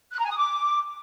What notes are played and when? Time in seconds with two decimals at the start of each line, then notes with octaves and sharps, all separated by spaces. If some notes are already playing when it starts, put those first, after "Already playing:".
0.13 F#6
0.19 A#5
0.25 G#5
0.31 D#6
0.37 D6